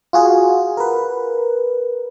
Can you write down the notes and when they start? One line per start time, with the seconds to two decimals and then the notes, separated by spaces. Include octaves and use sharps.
0.13 F4 F#4 G#4
0.77 A#4 B4